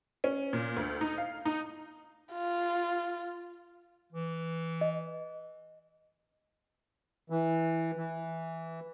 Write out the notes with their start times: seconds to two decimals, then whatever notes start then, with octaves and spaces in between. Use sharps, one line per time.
0.24 C#4
0.53 A#2
0.76 D2
1.01 D#4
1.18 F5
1.45 D#4
2.32 F4
4.12 E3
4.81 D#5
7.30 E3
7.97 E3